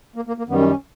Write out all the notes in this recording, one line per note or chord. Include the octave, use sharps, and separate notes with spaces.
A#3
A#3
A#3
F#2 D#3 G3 B3
C#4
C#4